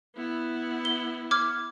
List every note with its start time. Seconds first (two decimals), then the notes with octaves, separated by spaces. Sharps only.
0.16 B3 E4
0.85 G7
1.31 D6 F6 G#6